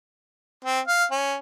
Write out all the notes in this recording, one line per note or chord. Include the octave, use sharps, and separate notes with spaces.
C4
F5
C#4